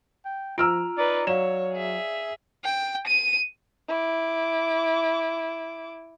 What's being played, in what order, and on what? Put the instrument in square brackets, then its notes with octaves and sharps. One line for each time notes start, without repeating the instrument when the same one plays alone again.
[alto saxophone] G5
[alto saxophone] F3 [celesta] F4 A#5 [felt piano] E6 F6 D7
[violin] D#4 B4 [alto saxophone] D5
[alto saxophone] F#3 [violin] C#5 [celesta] D5 F5 [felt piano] E7
[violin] G#4 E5
G5
D#7
E4 D6